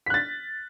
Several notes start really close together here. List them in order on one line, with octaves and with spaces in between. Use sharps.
B6 F#6 A6